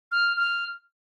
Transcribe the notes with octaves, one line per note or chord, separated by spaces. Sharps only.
F6
F6